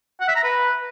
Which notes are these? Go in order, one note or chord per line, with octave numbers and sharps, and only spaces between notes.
F#5
E5
A#5
B4